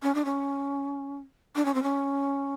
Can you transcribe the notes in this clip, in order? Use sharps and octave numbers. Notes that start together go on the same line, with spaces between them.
C#4
D4
C#4
D4
C#4
C4
C#4